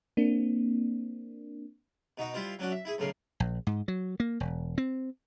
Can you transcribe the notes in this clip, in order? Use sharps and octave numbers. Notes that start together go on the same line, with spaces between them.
A#3 C4 D4
B2 D#4 F#4 D#5
G3 E4 F4 C5
F#3 C#4 D4 F#4
E5
E4 G#4
B1 A2 C#3 A#4 C6
A#1
G#2
F#3
A#3
E1
C4